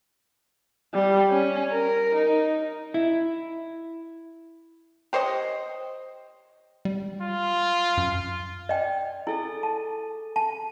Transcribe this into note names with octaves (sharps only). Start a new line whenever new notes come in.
G3
C#4
A#4
D#4
E4
G4 C5 C#5 D#5
G3
F4
F#2
D5 D#5 G5
E4 G#4 A4 A6
A5
A5